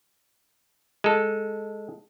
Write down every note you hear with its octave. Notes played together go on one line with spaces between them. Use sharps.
G#3 A4